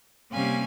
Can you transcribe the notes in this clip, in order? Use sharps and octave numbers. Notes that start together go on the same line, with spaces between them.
C3 G3 A#3 C#4 F5 G#5